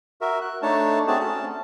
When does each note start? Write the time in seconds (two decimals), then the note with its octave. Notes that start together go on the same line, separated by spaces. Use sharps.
0.21 F#4 A#4 E5
0.41 F#6
0.62 A3 D4 D#4 C#5 A5
1.08 A3 C4 D4 F#4 G#4 A5
1.20 C#4 A5